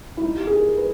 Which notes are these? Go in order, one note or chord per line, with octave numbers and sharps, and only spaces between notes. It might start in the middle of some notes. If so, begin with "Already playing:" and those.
E4
D#4
G4
G#4
A#4
B4